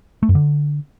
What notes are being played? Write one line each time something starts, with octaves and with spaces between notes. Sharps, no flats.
A3
F#2
D3